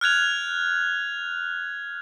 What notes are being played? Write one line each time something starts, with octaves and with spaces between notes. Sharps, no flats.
F6 F#6 G#6 F7